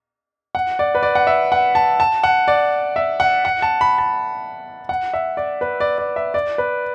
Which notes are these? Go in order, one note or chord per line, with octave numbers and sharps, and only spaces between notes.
F#5
D5
B4
D5
F#5
E5
F#5
A5
A5
F#5
D5
E5
F#5
F#5
A5
B5
A5
F#5
E5
D5
B4
D5
D5
E5
D5
B4